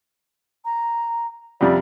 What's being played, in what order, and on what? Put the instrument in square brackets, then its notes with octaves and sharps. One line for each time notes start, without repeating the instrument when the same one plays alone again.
[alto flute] A#5
[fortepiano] F2 C3 G3 [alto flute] D5